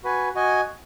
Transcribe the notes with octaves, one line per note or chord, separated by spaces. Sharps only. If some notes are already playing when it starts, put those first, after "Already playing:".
F#4 B4 G#5
F#4 D#5 G#5